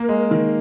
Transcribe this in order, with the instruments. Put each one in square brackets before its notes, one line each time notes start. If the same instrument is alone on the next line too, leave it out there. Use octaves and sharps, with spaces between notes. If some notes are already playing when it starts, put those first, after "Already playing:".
Already playing: [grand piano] A#3 [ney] A#4
[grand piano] G#3
D#3